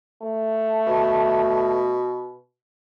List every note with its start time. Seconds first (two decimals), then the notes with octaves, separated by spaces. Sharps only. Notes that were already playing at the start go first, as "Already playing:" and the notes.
0.22 A3
0.87 B2